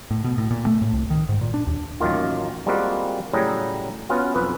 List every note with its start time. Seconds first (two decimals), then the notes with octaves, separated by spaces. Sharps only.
0.11 A2
0.24 B2
0.38 A2
0.51 A#2
0.67 A3
0.82 A2
0.93 C2
1.10 D#3
1.29 G#2
1.41 A#2
1.54 D4
1.67 D#2
2.00 A1 F#2 D#3 A#3 F4
2.66 G3 G#3 A#3 C4 F4 F#4
3.34 A2 C#3 F#3 G3 G#4 A#5
4.09 B3 C#4 F4 F#4
4.34 B1 F2 B4